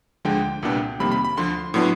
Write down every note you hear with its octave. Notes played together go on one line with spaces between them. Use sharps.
D2 D3 F3 G#3 G5
C2 A#2 G3 B3 D4
F2 C3 D#3 G3 A#3 B5
B5
B5
D2 D3 F3 C6
A2 F#3 B3 D4